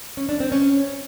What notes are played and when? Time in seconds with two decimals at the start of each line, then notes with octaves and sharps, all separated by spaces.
0.17 C#4
0.29 D4
0.40 C4
0.52 C#4